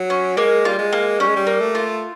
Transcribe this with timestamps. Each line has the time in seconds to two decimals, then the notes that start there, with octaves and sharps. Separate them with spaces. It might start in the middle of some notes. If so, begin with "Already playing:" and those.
Already playing: F#3
0.10 C#4
0.37 G#3 A#3
0.65 G3 F4
0.79 G#3
0.92 A#3
1.20 G3 C#4
1.28 G#3
1.36 G3
1.47 A#3
1.61 A3
1.75 F4